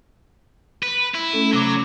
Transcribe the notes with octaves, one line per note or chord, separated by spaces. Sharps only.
B4
E4
A3 C#4 A4
C3 F#3 D6 G#6